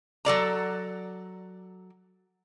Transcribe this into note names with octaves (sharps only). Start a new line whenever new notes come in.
F#3 A4 D5 A#5